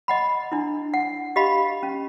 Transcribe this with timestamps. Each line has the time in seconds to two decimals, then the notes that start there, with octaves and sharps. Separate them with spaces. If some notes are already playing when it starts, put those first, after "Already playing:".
0.08 D#5 F#5 B5
0.52 D4 E4
0.94 F#5
1.36 G4 D#5 F5 B5
1.83 C#4